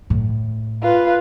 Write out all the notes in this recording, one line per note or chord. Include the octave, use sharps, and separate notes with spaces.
A2
F4 B4